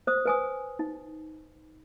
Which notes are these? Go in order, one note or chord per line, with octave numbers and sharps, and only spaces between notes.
C5 D#6
B4 G#5 D#6
D#4